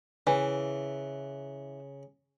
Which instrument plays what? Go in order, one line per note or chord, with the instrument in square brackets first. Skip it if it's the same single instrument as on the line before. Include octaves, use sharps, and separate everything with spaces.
[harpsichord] C#3 [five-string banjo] E3